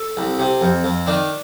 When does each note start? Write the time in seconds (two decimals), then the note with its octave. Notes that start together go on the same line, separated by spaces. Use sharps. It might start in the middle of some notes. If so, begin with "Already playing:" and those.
Already playing: A4
0.17 C2
0.39 C3
0.61 F2
0.84 F2
1.07 D#3 D4